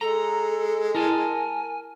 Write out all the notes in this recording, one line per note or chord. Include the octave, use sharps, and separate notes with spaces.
G#3 A4 A#5
E4 A#4 G#5 A5